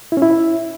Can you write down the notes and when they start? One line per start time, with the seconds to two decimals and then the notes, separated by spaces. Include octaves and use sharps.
0.12 E4
0.17 C#4
0.22 E4